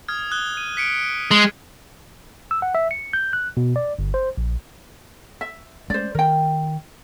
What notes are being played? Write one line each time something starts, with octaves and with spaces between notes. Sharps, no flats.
D#6 F6 G#6
D#6 F#6 G7
D#7
B6 C#7 D7
G#3 G#6
E6
F#5
E5
C#7
G6
F#6
B2
D5
G1
C5
A#1
E5
G#3 A3 C#4 C5 D5
D#3 A#4 G5